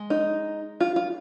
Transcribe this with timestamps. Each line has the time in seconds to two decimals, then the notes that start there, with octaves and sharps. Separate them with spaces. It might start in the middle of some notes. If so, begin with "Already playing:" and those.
Already playing: G#3
0.10 D#4
0.80 F4
0.96 F4